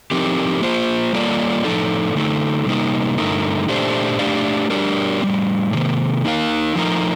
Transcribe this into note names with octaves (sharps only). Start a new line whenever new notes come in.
F3 C4 D#4 G4 A#4
A#3 F4 C5
G3 A#3 F4 A4 D5
A2 F3 A#3 D#4 A4
D3 A3 D#4 A4
C3 G3 A#3 D#4 A#4
G2 D3 A3 D#4 A#4
A#2 A3 D4 G4 C5
A3 D4 G4 D5 F5
G3 D4 G4 A#4 D5
A2 G3 C4
C3 D#3 A#3
A#3 D#4 A#4 F5
F3 A3 D#4 A#4